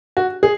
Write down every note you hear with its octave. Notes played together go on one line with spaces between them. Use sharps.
F#4
G#4